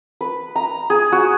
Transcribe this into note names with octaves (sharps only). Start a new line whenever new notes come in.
B4
A#5
G#4
F#4